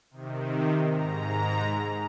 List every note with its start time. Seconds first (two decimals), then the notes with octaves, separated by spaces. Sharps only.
0.11 C3 D#3
0.85 G#2 A#5